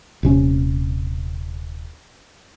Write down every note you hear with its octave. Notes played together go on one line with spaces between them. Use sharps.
D#1 C3 C#4